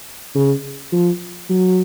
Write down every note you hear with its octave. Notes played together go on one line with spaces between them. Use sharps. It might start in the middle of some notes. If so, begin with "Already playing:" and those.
C#3
F3
F#3